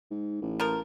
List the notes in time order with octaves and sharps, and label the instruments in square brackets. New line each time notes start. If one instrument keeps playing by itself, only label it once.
[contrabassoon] G#2
A1
[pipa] F3 A#4